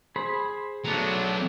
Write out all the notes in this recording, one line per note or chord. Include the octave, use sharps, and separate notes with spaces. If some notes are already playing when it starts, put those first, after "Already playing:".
G#4 C5 B5
F#3 A3 B3 D4